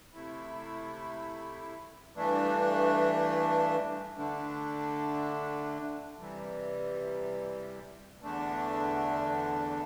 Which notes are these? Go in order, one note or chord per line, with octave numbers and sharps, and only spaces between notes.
C3 A3 E4
G2 E3 A3 D4
D3 A3 D4
C3 E3 G3
E2 D3 A3 D4